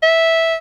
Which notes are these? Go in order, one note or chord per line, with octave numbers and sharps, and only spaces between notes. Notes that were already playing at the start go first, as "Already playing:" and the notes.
E5